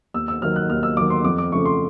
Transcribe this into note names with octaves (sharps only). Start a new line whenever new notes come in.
D#2 E6
E6
D#3 F#3 F6
F#6
D#2 F6
E6
D#3 F#3 D6
C6
F2 D6
D6
C#3 F3 A3 C#6
C6